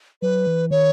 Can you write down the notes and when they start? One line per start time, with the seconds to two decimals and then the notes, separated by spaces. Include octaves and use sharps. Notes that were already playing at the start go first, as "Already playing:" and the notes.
0.22 F#3 B4
0.46 E3
0.71 D#3 C#5